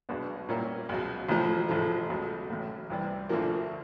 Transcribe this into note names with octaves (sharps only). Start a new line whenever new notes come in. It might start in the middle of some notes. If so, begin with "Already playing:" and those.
B1 B2 G#3 B3 D4
A#2 G3 A#3 C#4 E4
C#2 B2 F#3
A1 A2 F3 A3
A1 G#2 F3 A3
C#2 B2 F#3 A3
A1 A2 F#3
C2 C3 E3 G3
D2 D3 F3 A#3